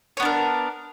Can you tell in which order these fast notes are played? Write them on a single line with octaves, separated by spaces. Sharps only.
C#5 B3 D4 A#4